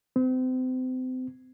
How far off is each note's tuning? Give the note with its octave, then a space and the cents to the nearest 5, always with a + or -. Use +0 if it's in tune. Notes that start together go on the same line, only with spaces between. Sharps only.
C4 -35